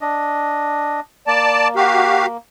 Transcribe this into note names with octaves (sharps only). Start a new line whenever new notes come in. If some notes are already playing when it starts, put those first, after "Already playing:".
D4 D#5
A#3 D5 A5
F#4 G4 F5